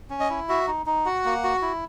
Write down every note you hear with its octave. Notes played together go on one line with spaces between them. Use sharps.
C#4
D#5
E4
F#4 E5
D#4
D#4
F#4 F#5
A#3
F#4
E4